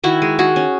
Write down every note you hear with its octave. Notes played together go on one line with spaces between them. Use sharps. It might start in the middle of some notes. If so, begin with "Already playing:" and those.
D#3 E4 F#4
G#3
D#3 F#4 G#4
C#4